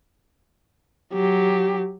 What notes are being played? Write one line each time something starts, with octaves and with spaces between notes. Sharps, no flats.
F#3 G4